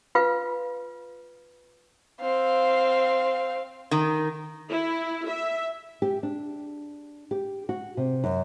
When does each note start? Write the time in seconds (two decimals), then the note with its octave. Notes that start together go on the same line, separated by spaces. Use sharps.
0.15 F4 B4 F5
2.21 C4 F5
3.91 D#3
4.69 E4
5.27 E5
6.02 G4
6.23 D4
7.31 G4
7.69 F#4
7.97 C3
8.24 F#2